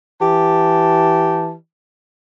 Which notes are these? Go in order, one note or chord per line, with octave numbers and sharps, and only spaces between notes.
E3 G4 A5